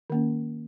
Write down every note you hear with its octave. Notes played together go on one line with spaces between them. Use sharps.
D#3 A#3 C#4